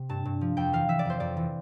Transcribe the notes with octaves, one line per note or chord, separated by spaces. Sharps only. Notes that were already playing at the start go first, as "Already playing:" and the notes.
Already playing: C3
G2 A5
G2
F3
F2 G5
E3 F5
E3 E5
D5
F2 C5
F2 D5
E3